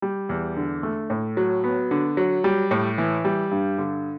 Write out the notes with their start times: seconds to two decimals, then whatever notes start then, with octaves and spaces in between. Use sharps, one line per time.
0.02 G3
0.29 E2
0.56 D3
0.83 A3
1.10 A2
1.37 F#3
1.64 B3
1.91 D3
2.17 F#3
2.44 G3
2.71 A2
2.98 E3
3.25 G3
3.51 G2
3.78 D3